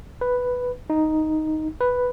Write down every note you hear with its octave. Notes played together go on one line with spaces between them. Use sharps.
B4
D#4
B4